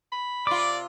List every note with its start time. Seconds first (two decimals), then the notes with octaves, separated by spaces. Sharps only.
0.12 B5
0.47 C3 F4 D5 D6